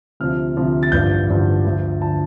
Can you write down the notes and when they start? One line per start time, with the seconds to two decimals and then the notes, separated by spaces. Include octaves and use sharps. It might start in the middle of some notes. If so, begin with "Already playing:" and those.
0.20 D2 C3 F3 F6
0.57 D2 C3 F3
0.83 A6
0.92 A1 G2 D3 F3 G6
1.28 A1 G2 D3 F3
1.65 D2 D3 F3
2.01 D3 F3 A5